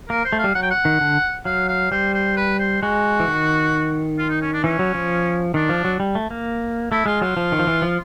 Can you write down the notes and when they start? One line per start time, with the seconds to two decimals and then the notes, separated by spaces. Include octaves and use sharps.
0.09 A#3 A#4
0.25 C5
0.33 A3
0.39 G3 F5
0.55 F#3 F#5
0.63 G5
0.71 F#5
0.85 D#3
1.01 D3
1.45 F#3 F5
1.68 F5
1.91 G3 C5
2.14 C5
2.37 B4
2.59 C5
2.82 G#3 F#4
3.20 E3
3.28 D#3
4.19 F4
4.30 D#4
4.41 C#4
4.53 D4
4.64 E3 C#4
4.79 F#3
4.95 F3
5.54 D#3 D4
5.69 F3
5.85 F#3
6.00 G3
6.15 A3
6.31 A#3
6.91 A3 E4
7.06 G#3 F4
7.21 F#3 F4
7.37 F3
7.52 D#3
7.59 F3
7.67 E3
7.82 F3